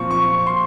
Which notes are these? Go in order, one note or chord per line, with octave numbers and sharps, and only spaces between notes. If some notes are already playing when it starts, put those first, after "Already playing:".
Already playing: A#2 F3 C4 F4 C#6
C#6
C6